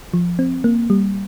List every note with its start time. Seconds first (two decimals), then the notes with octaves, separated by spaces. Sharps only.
0.14 F3
0.39 C4
0.64 A#3
0.90 G3